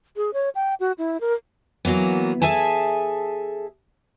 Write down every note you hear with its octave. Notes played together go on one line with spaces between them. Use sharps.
G#4
C#5
G5
F#4
E4
A#4
E3 F#3 A#3 B3
G#4 A4 E5 G#5 A5